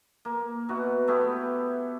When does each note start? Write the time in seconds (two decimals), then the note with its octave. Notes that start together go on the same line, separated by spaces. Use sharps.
0.25 A#3
0.69 B2 E4 F#4
1.07 A3 B3 E4 G4